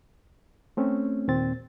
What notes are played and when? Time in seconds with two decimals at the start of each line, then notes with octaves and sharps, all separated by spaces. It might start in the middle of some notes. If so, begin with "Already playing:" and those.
0.77 A3 C4 C#4
1.28 D#2 A#2 C4 A6